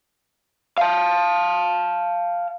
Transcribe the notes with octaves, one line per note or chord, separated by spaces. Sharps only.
F5 A5